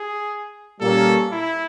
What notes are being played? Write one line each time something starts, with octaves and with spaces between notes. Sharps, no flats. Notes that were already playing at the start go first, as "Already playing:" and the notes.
Already playing: G#4
A#2 G3 A#3 C#4 A4
E4